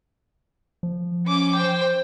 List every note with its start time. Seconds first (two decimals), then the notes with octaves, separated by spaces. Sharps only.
0.83 F3
1.26 C#4 D6
1.56 C5 G5